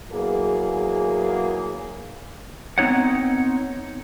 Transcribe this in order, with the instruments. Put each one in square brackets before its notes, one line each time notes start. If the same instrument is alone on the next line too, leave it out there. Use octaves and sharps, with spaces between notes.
[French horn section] E2 F#3 A#3 G#4
[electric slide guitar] B3 C4 D#4 C#5 F#5